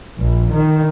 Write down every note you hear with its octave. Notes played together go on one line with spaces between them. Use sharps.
A#1
D#3